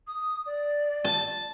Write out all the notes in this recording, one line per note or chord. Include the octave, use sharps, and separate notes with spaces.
D#6
D5
A5